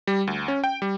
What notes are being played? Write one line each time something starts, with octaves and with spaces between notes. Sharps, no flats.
G3
D2
C#4
G5
G3